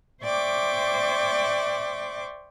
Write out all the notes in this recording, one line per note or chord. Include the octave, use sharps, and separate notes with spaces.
C5 D5 E5 G5 C#6 D6